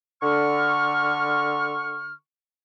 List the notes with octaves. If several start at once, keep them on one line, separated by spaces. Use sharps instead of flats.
D3 C#6 F6